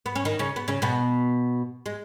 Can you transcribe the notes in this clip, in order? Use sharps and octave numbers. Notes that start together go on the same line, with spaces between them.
B3
C#4
D#3 D#4
C#3 C#4
B3
C#3 C#4
B2 B3
G#3